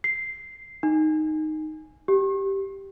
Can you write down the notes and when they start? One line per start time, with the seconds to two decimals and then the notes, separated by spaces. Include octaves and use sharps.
0.04 C7
0.83 D#4
2.08 G4